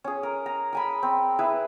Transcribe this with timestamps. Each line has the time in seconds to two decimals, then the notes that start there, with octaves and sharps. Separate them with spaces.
0.04 C#4 G#4
0.23 A#4
0.46 A#5
0.73 A#4 G#5 B5
1.03 C4
1.39 E4 G#4 B4